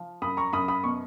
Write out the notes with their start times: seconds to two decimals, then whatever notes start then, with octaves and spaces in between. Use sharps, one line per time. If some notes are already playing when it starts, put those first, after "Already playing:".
Already playing: F3
0.22 F#2 B5 D#6
0.37 A#5 C#6
0.53 F#2 B5 D#6
0.68 B5 D#6
0.84 B2 C#6